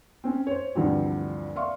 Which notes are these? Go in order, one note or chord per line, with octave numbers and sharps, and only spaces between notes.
C4 C#4
C5 C#5
D2 G2 D3 E3 F3 C4
D5 E5 F5 C6 C#6